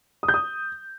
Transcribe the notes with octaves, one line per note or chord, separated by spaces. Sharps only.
D#6
G6
D#6